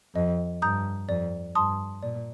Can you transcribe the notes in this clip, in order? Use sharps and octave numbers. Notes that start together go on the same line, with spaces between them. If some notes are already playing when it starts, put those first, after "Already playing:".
F2 D#5
G2 A#5 D#6 G6
F2 D5
G2 A5 C6 D#6
A#2 D5